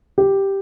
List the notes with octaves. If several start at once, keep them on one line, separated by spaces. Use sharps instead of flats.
G4